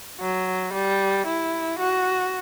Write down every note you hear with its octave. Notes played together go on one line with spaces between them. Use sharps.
F#3
G3
E4
F#4